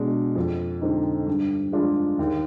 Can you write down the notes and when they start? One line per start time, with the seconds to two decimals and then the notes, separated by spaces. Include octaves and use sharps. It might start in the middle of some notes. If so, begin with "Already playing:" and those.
Already playing: B2 G#3 D4
0.36 F2
0.81 D3 G#3 C4 D#4
1.27 G2
1.72 F3 G#3 D4 F4
2.19 D#2